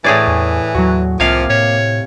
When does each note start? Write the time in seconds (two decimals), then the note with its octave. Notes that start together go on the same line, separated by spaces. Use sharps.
0.04 A2 E3 G#4 C#5 D5
0.27 E2
0.75 D#2 F#3 F#4
1.20 C2 C3 F3 A#3 F5 D6 G#6
1.50 A2 C#5